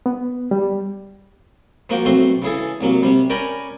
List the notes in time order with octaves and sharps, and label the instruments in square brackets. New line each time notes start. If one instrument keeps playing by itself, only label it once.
[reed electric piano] B3
G3
[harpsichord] F3 A#3 F#4 G5
B1 A3 C4 F#4 C6
C#3 E3 G#4 A4
C2 F#3 A#3
C3 G3
C#4 A#4 D5 G5 G#5 B5